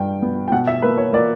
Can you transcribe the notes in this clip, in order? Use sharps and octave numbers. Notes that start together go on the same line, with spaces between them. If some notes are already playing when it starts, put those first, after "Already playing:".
Already playing: G2 G3 G5
B3
G5
B2 F#5
E5
A#3 B4
C#5
A#3 D5